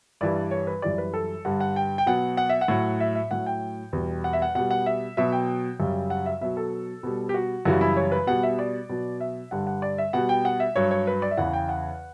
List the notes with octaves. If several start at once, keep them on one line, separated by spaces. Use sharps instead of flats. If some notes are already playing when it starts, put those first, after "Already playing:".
G2 E3 G3 D5
C#5
B4
F#2 E3 G3 D5
B4
A4
G2 D3 G3 F#5
F#5
G5
G5
B2 F#3 F#5
F#5
E5
F#5
A2 F#3
E5
E5
A2 F#3 F#5
G5
E2 B2 G3
F#5
E5
F#5
B2 G3 F#5
F#5
E5
B2 F#3 E5
G5
F#2 C#3 G3
F#5
E5
B2 F#3 E5
A4
B2 G3
G4
F#4
F#2 C#3 E3 G3 F#4
E4
C#5
B4
B2 G3 F#5
E5
D5
B2 F#3
E5
G2 D3 G3 F#5
F#5
D5
E5
B2 G3 F#5
G5
F#5
E5
G2 F#3 C#5
C#5
B4
D5
E5
E2 C#3 E3 F#5
G5
F#5